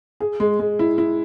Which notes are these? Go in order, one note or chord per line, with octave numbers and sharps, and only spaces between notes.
G#4
G#3
G#3
E4
E4